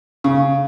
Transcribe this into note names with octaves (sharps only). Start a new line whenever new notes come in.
C#3